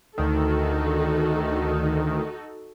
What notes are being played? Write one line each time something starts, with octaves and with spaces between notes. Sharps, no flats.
D2 D#3 D#4 F#4 A4